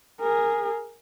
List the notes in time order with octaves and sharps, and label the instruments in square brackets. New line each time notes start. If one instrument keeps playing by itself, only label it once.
[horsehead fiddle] G#4 A#4